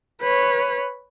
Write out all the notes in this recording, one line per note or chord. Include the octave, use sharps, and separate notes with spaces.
B4 C#5